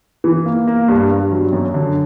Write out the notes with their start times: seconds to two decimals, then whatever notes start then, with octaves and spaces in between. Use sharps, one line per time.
0.24 E3
0.46 A#3
0.68 A#3
0.88 G2
1.10 G2
1.32 F#3
1.53 F#2
1.74 D3